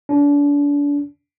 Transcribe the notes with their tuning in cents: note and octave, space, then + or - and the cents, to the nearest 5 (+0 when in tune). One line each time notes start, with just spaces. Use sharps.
D4 -35